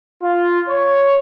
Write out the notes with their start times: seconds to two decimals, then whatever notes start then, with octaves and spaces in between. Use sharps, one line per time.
0.22 F4
0.68 C#5